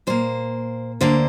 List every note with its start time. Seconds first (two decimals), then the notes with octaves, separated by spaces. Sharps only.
0.07 A#2 A#3 C5
1.01 D2 D3 A#3 C5